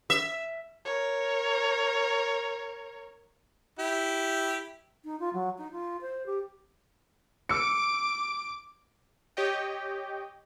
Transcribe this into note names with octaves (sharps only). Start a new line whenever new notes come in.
E5
A#4 C#5
E4 G4
D#4
F4
F#3
D#4
F4
C5
G4
D6 E6 C#7 D7
G4 C#5 D#5 G5